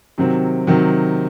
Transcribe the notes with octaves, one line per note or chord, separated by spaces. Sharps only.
C3 D#3 F#3 C4
C3 D#3 F#3 C4